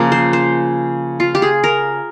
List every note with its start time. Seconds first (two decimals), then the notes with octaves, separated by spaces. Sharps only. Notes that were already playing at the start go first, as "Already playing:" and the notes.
Already playing: C#3 F3 A#3
0.12 C5
0.33 C5
1.20 F4
1.35 G4
1.42 G#4
1.64 A#4